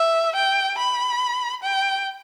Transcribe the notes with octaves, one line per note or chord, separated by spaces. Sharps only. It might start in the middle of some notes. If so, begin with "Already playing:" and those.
Already playing: E5
G5
B5
G5